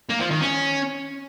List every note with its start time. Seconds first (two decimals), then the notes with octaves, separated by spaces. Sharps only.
0.09 A#3
0.20 F3
0.30 D#3
0.41 C#4